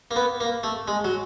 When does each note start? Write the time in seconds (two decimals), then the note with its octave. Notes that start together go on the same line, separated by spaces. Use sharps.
0.11 A#3
0.16 B3
0.40 A#3
0.63 A3
0.88 G#3
1.04 F#3